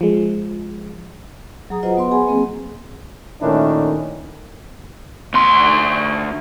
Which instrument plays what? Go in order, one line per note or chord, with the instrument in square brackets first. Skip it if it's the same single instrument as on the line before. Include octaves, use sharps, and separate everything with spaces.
[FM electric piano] F3 G#3
[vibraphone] F#3 G#4 A#5 D#6
F4 F#4 B4 C5 D#5 F#5
B3 F#4 B4 D#5 F#5 C6
G#4 G#5 B5 C6
F#3 A#3 C4 G#4
[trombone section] A#2 D#3 A3 C#4 D4 E4
[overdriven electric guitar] D2 C6